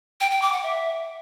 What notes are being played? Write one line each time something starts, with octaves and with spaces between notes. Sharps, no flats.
G5
G5
D6
F#5
E5